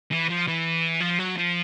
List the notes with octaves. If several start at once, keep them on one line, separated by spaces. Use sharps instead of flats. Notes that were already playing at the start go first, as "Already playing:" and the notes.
E3
F3
E3
F3
F#3
F3